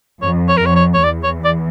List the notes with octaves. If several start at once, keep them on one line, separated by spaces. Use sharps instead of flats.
F2 C#5
C#5
A#4
F2 C#5
C#5
C#5
E2 D5
C#5
D5